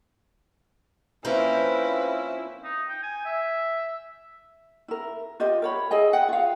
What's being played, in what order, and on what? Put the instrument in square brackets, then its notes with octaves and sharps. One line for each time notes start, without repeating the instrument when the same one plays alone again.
[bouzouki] F3 A#3 [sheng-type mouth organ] C4 C#4 [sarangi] E4 [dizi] B4
[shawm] D#4
G5
G#5
E5
[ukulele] E4 A#4
F4 G4 D#5
A#4 C#5 B5
E4 G#4 D#5 G#5
F#5 G5
F4 F5